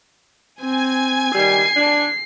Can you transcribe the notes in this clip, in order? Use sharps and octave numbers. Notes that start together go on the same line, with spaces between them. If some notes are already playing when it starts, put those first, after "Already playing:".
C4 G#5 G#6
D#3 G3 C7
D4